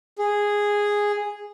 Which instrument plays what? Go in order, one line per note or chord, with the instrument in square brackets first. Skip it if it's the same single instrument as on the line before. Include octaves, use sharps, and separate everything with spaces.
[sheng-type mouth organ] G#4